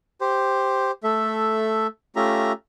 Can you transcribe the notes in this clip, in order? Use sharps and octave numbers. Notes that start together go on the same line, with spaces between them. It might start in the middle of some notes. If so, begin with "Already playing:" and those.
G4 C5
A3 A4 E5
A3 C#4 F4 G4 E5 A#5